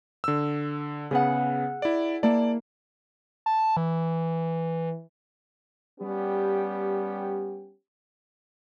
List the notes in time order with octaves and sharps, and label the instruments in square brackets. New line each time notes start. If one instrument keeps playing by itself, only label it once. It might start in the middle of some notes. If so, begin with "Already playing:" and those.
[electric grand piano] D3 E6
[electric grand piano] C#3 B3 [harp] G#4 F#5
[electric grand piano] E4 D5
[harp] A#3 E4 [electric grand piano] D5 A5
[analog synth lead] A5
E3
[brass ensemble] G3 B3 C#4 G4